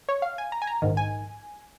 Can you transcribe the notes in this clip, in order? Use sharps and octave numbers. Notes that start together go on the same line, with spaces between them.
C#5
F5
G#5
A#5
G#5
A#5
A#1 G#2 D#3
G#5